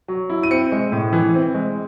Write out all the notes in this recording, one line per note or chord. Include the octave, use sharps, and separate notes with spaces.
F#3
E4
D#7
C4 C#7
G#3
A2
E3
C4
G#3